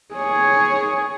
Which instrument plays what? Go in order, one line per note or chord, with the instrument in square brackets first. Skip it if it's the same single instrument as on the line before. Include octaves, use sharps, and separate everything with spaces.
[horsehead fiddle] G#4 C#5